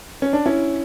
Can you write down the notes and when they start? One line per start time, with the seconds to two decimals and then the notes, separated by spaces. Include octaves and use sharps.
0.22 C#4
0.33 D4
0.46 C#4 E4